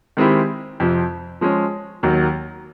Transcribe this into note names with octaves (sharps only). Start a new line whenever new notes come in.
D#3 G#3 C4 E4 G4
F2 C3 F3
F3 G#3 C#4
D#2 D#3 F#3